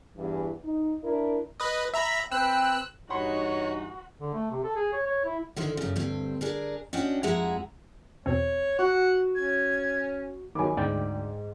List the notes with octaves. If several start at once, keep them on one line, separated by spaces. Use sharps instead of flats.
E2 G2 E3
D#4
D4 E4 A#4
B4 D#5
E5 A#5 B5
C4 B4 G5 E6 F#6
G2 E3 D#4 F#4 C#5 F#5 B5 C6
D3
A3
C3
A4
G#4
C#5
C#5
E4
D3 D#3 E4 C5
F#2 C#3
D2 G2 C4
D4 G#4 A#4
C#4 D4 F#4 D#5 G5
F2 G#3 E4 G#4 F#5 A#5
E2 B2 C4 C#5
F#4 F#5
C#4 G#6
D#3 F#3 G#5 B5 D6
D2 G#2 D5 G5